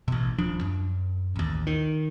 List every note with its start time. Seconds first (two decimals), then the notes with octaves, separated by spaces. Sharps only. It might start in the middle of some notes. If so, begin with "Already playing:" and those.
0.08 A1 B2
0.38 D#1 F3 D4
0.61 F#2
1.36 A1 D#2
1.67 D#3